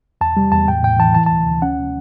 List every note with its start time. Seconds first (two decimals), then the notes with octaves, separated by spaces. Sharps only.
0.21 E2 A5
0.37 G3
0.52 E2 A5
0.68 A2 G5
0.83 A2 G5
0.99 E3 A5
1.14 E3 A5
1.26 A5
1.30 D2
1.47 D2
1.62 C#4 F#5